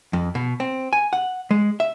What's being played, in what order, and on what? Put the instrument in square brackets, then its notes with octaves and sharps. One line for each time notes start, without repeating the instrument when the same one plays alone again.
[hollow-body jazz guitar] F2
B2
C4
G#5
F#5
G#3
E5